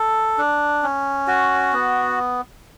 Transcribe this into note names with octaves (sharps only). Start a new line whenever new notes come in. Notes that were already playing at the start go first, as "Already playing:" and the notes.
Already playing: A4
D4
C#4
F#4
B3